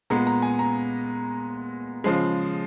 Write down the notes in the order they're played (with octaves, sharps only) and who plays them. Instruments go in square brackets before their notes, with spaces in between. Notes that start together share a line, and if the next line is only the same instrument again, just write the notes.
[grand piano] A#2 G#3 B3 A#5
A#5
G#5
A#5
C#3 F3 G#3